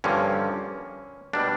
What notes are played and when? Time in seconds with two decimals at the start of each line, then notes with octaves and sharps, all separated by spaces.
0.04 G2 D3 F3 A#3 C#4
1.33 B2 G3 A#3 D4